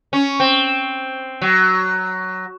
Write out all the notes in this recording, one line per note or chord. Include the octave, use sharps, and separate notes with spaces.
C#4
C4
F#3